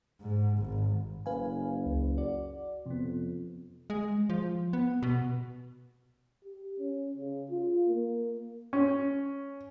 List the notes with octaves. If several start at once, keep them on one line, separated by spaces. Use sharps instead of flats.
G#2
G#1
F#1 B4 F5 G#5
C#2
F#4 D5
F2 C3 B3
G#3
F3
B3
B2
G4
C#4
C#3
F4
A#3
C#4